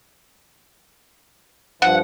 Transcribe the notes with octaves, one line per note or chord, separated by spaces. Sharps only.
G2 F3 F#5